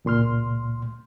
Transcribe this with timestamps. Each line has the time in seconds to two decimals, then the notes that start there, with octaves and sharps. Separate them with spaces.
0.05 C#2 A#2 C6 F6